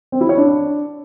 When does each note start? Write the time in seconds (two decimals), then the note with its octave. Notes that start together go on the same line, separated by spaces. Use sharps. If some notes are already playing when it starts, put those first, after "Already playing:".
0.12 C4
0.21 E4
0.29 C#5
0.38 D4